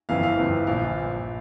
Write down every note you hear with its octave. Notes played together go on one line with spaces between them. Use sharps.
G1 F2 E3 F5
F5
G1 F2 E3
A#1 A#2 F3 F5